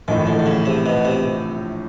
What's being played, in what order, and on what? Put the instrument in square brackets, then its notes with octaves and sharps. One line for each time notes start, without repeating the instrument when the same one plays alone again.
[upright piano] A#1 A2 E3 [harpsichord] D#3
[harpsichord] D3
D3
C#3
C3
B2
C3